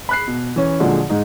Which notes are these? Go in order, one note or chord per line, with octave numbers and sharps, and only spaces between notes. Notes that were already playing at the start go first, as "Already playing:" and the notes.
B5 F#6 C7
B2
E3 C#4
A#2 D3 F3 F#3 G#3
G#2 G#3 D#4 G#4